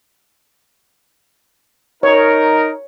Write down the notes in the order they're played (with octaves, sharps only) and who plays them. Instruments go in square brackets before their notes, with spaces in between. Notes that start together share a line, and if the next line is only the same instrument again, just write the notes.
[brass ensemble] D#4 A#4 [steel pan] C#5